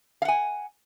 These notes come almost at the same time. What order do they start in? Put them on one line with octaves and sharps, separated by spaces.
F5 F#5 G#5